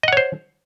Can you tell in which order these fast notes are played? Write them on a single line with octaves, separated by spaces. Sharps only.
D#5 F#5 C#5 C5